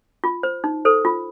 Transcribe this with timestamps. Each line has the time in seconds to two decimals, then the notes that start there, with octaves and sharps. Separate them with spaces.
0.24 F4
0.43 C5
0.64 D#4
0.85 A4 C5
1.05 F4